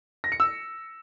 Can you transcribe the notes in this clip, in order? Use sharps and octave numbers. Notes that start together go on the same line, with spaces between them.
A#6
C#7
E6